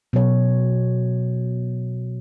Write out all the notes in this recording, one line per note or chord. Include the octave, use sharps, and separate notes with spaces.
B2 F#3 C#5